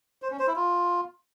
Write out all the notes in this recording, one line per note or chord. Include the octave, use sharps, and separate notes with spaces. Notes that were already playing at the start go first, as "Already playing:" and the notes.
C5
C#4
C5
E4
F4